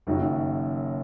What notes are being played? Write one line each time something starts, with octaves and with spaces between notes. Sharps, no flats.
F#1 F#2 D#3 F#3